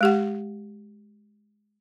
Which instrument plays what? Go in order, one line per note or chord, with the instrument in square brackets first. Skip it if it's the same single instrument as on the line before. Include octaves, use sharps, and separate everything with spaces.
[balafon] G#3 G4 F#5